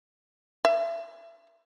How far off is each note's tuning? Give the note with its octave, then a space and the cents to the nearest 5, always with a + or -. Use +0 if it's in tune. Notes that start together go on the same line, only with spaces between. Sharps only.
E5 +30